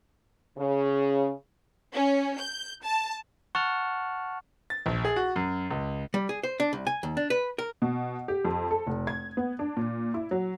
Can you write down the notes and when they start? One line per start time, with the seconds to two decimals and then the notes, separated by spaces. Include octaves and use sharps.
0.58 C#3
1.93 C#4
2.39 G6
2.83 A5
3.55 F#5 A5 C#6 F6
4.70 A6
4.86 A#1
5.04 G#4
5.16 F#4
5.36 F#2
5.71 C#2
6.14 G3
6.29 G#4
6.43 C5
6.60 D4
6.73 C2
6.87 G#5
7.03 D#2
7.17 D4
7.30 B4
7.58 A#4
7.82 B2
8.28 G4
8.45 F2
8.71 A4
8.87 F1
9.07 G#6
9.37 B3
9.59 D4
9.77 A#2
10.14 E4
10.31 F#3